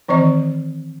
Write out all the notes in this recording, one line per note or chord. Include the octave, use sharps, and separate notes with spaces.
D#3 E3 C4 C5 D#5